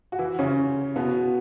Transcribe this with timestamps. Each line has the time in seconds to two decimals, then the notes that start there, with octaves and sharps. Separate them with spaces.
0.12 F#4
0.19 E3 E4
0.39 C#3 C#4
0.96 B2 B3